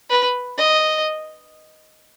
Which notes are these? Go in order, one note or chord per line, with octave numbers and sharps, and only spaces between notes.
B4
D#5